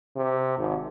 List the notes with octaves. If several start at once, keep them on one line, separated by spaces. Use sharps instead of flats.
C3
G#1